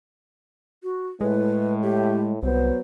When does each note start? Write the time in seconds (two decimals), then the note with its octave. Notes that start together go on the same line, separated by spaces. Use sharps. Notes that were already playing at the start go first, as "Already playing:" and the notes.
0.83 F#4
1.21 A2 G#3 B4
1.82 G4
2.43 C2 F#3 B3 C5